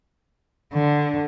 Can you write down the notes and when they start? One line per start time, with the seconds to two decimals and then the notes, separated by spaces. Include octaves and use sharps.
0.73 D3